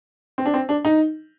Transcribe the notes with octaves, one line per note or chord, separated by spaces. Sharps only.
C4
D4
C4
D4
D#4